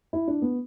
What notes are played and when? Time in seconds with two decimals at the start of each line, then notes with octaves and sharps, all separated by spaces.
0.13 E4
0.28 D4
0.42 B3